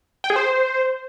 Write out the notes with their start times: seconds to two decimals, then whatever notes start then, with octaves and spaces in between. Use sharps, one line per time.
0.24 G5
0.30 G#4
0.36 C5